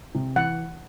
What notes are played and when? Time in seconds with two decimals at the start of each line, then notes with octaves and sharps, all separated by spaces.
0.15 C3
0.36 E3 F#5